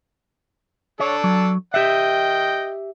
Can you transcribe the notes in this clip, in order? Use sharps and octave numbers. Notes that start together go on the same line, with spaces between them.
D4 A4 C#5
F#3
G4 D#5 E5 G5